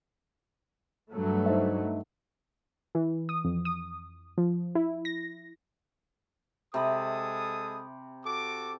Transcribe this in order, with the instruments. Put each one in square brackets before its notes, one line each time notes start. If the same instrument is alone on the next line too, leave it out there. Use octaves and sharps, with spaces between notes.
[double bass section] G2 F#3 A3
[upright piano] D#4 C5 E5
[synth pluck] E3
D#6
F2
D#6
F3
E4
A#6
[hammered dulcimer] C3 B5 [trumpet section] G#3 A4 D#6
[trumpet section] F#4 A4 D6